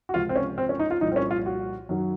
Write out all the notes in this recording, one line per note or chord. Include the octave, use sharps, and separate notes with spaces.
F#4
C#2 C3 F3 F4
C4
C#4
C4
C#4
D#4
F4
C2 A#2 F3 D#4
C4
C#4
F4
F#4
F#2 D#3 F#3